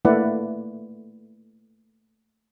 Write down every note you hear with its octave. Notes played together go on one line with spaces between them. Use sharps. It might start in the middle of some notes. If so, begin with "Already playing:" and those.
A3 A#3 E4 B4 D5 F#5